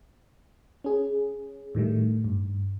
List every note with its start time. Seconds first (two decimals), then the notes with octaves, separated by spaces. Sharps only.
0.84 C#4 G#4
1.75 A2 D#3 G3 A3
2.24 G2